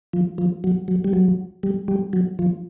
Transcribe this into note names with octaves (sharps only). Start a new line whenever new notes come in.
F3
F3
F#3
F#3
G3
F#3
G3
G3
F#3
F3